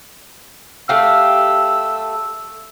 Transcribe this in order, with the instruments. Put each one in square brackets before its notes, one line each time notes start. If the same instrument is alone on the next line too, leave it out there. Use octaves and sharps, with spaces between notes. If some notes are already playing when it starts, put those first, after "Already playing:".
[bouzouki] A3 G4 F5 [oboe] E6